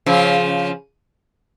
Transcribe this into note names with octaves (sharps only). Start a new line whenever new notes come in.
C#3 F3